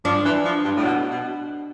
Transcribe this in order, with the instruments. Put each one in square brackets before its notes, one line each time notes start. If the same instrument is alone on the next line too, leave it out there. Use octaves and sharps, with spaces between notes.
[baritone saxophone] F3 [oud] D4
[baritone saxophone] E3
F3
G2
A2
B2
B2